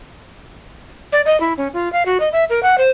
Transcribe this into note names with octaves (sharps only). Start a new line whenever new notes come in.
D5
D#5
E4
C#4
F4
F5
F#4
D#5
E5
A#4
F#5
C5